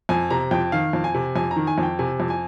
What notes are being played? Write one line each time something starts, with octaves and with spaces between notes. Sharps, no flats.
F2 G#5
C3 A#5
F2 G5
D#3 F5
F2
G#5
C3
F2 G#5
A#5
D#3
G#5
F2
G5
C3 G#5
F2
G#5